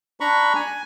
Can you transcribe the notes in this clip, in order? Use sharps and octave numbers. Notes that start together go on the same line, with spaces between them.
D4 A#5 B5 C#6
G#5